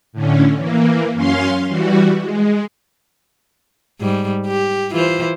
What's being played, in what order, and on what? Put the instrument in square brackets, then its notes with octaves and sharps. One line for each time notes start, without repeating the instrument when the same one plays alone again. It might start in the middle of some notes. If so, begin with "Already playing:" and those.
[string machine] A2 D3 C#4
E3 A#3
F#2 C#4 F5 C6
E3 G3 F#4
G#3
[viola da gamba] G#2 G3
G4
E3 F4 C5